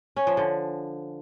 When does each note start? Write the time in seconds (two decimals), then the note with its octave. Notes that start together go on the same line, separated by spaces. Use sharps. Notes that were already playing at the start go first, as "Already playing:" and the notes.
0.16 C#4
0.27 F3
0.37 D3